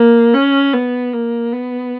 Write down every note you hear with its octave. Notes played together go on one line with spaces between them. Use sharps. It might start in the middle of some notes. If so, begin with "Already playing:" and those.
Already playing: A#3
C#4
B3
A#3
B3